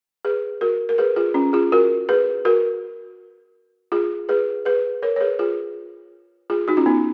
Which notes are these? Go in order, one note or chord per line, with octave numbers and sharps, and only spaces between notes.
G#4 B4
F#4 A#4
A#4
G#4 B4
F4 G#4
C#4 F4
F4 G#4
F#4 A#4
G#4 B4
F#4 A#4
F4 G#4
G#4 B4
G#4 B4
A#4 C#5
C#5
G#4 B4
F4 G#4
F4 G#4
D#4 F#4
C#4 F4
B3 D#4